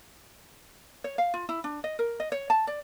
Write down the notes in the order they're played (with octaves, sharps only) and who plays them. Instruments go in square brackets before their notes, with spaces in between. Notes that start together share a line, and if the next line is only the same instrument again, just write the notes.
[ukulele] C#5
F5
F4
E4
D4
D#5
A#4
D#5
C#5
A5
D5